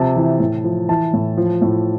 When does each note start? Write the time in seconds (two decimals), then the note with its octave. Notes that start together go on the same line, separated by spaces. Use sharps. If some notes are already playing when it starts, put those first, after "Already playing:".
Already playing: C3 F3 A5
0.16 E3
0.40 A2
0.64 F3
0.89 E3 A5
1.13 A2
1.37 F3
1.62 A2